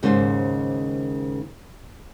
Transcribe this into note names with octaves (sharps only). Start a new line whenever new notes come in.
D#2 G#2 C#3 A#3 C5